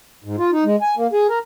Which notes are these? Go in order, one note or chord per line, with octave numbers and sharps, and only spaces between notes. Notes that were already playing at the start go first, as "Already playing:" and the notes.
G#2
F4
D#4
G#3
G#5
A#3
G#4
A#4